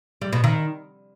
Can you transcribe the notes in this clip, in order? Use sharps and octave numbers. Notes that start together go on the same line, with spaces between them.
G3
B2
D#3